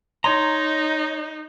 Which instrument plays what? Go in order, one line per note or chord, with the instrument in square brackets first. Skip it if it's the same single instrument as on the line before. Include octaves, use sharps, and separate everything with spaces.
[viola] D#4 [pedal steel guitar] C#5 A#5 [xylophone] C6